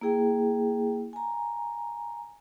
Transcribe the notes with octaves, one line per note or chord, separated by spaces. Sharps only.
A#3 E4 G#4 G5
G#5 A#5